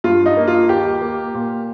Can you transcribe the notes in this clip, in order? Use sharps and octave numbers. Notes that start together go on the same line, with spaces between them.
G2 F4
D#4
A#3
F4
D#2 G4
A#3
A#2